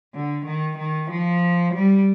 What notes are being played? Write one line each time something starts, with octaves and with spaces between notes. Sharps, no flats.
D3
D#3
D#3
F3
G3